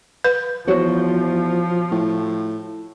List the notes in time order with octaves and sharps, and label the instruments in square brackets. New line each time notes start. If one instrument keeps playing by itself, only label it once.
[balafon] B4
[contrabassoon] E2 [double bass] F3 [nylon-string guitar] F#4 C5 C#5
[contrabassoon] A2